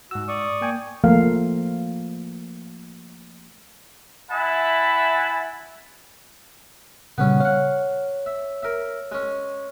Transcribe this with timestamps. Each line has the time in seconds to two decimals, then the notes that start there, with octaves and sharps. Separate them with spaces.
0.11 G#2 F#4 E6
0.28 D5 C#6 D#6
0.61 A#3 G5 G#5
1.04 F3 A3 A#3 F5
4.31 E4 E5 F#5 G#5 A5 B5
7.18 A#2 C#3 G3 B3 C#4
7.40 C#5 F5 F#5
8.26 E5
8.63 A#4 E5
9.12 G#3 C#4